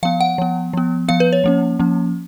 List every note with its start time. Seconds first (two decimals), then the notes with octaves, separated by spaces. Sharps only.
0.03 F3 B3 F5
0.21 F#5
0.38 F3 B3
0.73 F3 B3
1.08 F3 B3 F5
1.20 B4
1.33 C#5
1.44 F3 A#3 C#4
1.79 F3 A#3 C#4